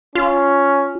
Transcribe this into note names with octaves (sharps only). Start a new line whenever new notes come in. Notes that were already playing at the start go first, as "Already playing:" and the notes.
C#4 F4